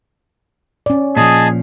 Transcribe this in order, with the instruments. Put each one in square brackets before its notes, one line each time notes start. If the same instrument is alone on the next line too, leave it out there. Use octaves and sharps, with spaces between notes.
[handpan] C#4 D5
[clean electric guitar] A#2 F3 [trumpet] G#4 [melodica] D#5 A5